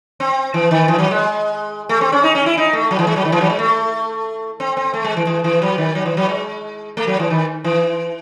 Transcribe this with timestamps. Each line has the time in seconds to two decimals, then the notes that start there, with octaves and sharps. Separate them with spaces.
0.20 C4
0.54 E3
0.71 D#3
0.88 E3
0.98 F#3
1.11 G#3
1.89 A3
2.01 C4
2.12 C#4
2.23 D#4
2.35 C#4
2.46 E4
2.57 D#4
2.73 A3
2.91 F#3
2.99 E3
3.07 G#3
3.16 F#3
3.25 D#3
3.32 E3
3.41 F#3
3.50 G#3
3.59 A3
4.60 C4
4.77 C4
4.94 A3
5.04 G#3
5.17 E3
5.27 E3
5.44 E3
5.62 F#3
5.78 D#3
5.95 F#3
6.06 E3
6.17 F#3
6.29 G#3
6.97 A3
7.07 F#3
7.19 E3
7.30 D#3
7.64 E3